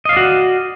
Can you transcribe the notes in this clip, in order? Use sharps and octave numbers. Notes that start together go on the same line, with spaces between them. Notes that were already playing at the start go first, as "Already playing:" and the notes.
F#4 D5 D#5 F5